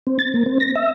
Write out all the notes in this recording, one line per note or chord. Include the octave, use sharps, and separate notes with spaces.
C4
A6
A#3
C4
A#6
E5